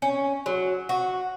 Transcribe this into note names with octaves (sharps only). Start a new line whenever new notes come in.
C#4
F#3
F#4